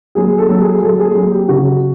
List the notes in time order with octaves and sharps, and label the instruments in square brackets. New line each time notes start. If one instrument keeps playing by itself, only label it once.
[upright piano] F#3 G#4
A4
F#3
G#4
F#3 A4
G#4
F#3
G4
C#3 F#4